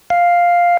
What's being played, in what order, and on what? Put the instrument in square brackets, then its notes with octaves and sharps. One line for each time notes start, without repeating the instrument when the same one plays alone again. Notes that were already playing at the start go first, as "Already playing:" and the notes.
[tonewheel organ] F5